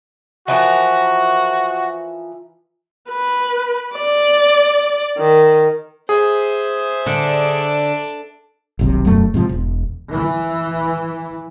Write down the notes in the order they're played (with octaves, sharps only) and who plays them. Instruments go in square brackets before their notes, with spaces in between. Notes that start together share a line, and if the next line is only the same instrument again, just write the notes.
[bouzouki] E3 F3 A#4 [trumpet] F#4
[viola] B4
D5
D#3
[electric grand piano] G#4 [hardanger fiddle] C5 E5
[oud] D3 [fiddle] D4
[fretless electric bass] D#1 B1 C3
E1 F#2 F#3 A3
G#2 C3 F3
E1
[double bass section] E3